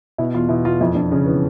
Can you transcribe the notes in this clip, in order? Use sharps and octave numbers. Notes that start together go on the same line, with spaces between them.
B2 E4
E2 F4
B2 E4
E2 F4
F2 E4
F2 D4
C#3 C#4
E3 B3